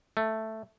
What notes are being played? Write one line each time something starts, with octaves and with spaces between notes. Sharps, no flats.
A3